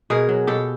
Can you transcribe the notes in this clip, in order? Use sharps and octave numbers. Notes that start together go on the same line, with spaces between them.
B2 G#4 A#4
F#3
B2 G4 A4